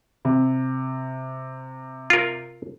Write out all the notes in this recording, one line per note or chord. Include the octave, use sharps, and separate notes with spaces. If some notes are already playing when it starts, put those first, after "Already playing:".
C3
F4 A#4